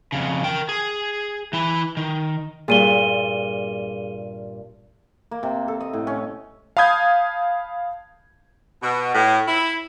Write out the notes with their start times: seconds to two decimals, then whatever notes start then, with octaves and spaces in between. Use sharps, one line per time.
0.12 F2 C#3
0.44 A#4 G5
0.69 G#4
1.53 E3 E4
1.97 D#3
2.68 G2 A#2 G#4 D#7 G7
5.31 A#3
5.43 C3
5.68 A4
5.81 D#5
5.93 A2
6.07 C#4
6.77 F5 A5 B5 D#6 G6 G#6
8.82 B2
9.15 A2
9.47 E4